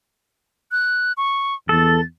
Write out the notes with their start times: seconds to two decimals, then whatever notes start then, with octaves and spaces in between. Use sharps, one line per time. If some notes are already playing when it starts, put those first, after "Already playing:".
0.72 F#6
1.17 C#6
1.69 E2 A4 A6